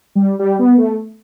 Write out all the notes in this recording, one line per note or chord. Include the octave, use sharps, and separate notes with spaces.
G3
G3
B3
A3